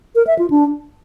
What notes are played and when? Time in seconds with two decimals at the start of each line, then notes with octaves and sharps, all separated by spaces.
0.15 A#4
0.27 E5
0.39 F4
0.50 D4